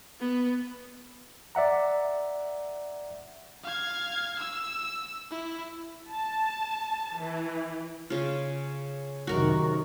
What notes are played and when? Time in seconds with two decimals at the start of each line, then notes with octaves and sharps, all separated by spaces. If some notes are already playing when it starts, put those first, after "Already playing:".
0.20 B3
1.55 D5 E5 F#5 A#5
3.63 F5 G#6
4.39 E6
5.30 E4
6.10 A5
7.21 E3
8.10 C#3 F4
9.27 F#2 C3 D#3 F#4 A#4